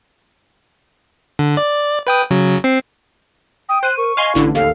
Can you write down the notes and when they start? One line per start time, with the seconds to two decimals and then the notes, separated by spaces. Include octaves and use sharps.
1.39 D3
1.57 D5
2.07 B4 G5 D#6
2.31 C#3 F#3
2.64 C4 C7
3.69 G5 D#6
3.83 C5 F#6 D#7
3.97 A#4 C#6
4.17 D#5 F5 G#5 C6
4.35 A1 D3 E4
4.55 D#2 A4 F5